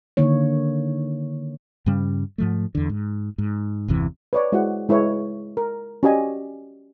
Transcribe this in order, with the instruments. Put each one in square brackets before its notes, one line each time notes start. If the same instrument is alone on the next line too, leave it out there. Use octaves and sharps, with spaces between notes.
[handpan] D3 D#3 A#3 C#5
[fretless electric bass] G2 C#3 G3 C#4
G#2 F3 A3
E2 D3
G#2
G#2
G1 E2 C3 E3
[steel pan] B4 C#5 D5
G#3 E4 F#4 C5 F#5
G#3 E4 B4 C#5
A#4
C#4 F#4 G4 D5 D#5 G#5